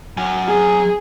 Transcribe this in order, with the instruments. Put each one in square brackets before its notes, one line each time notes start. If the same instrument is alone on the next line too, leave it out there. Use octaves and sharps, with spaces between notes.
[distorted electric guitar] F#3 G#5
[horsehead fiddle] G#4